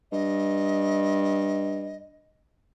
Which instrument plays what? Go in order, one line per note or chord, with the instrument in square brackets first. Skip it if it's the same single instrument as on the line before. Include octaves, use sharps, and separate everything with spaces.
[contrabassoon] G2 [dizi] D#5